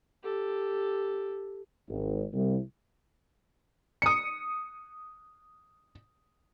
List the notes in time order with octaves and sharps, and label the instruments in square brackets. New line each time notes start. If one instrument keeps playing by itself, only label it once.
[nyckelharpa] G4 A4
[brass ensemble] G#1
C2
[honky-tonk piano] D#6 C#7